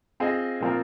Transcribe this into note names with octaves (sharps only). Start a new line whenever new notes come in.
C4 F4 G#4 D#5
A#2 F3 C4 F4 A#4